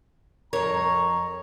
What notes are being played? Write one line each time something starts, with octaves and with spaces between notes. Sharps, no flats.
F2 A#4 C#5 A#5